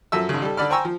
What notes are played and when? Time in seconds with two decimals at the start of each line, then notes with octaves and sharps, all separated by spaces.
0.12 F#2 F3 A4 E5 E6
0.29 G#1 C#3
0.42 G3 A4
0.57 D3 D5 B5 F6
0.70 C5 G5 G#5 A#5 C#6 E6
0.85 F3